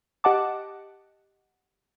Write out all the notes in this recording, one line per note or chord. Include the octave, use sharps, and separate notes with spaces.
G4 D#5 F#5 A5 D6